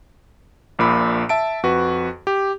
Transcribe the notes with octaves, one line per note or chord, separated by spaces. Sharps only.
A#1 A#2 B5
E5 A5 D7
F2 F#4 B4
G4